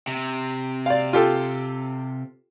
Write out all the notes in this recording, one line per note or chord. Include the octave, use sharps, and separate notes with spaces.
C3
D5 F5
F4 G4 A4